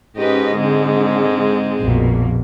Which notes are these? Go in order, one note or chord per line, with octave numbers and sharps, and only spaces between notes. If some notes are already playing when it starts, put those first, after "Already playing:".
G#2 C#4 G4 B4 D#5
D3 G#3 C4
A#1 F2 B2 A#3